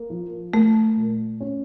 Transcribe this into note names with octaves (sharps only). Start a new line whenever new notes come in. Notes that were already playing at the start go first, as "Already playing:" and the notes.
Already playing: A#3
F3
A3 A#3
A#2
C#4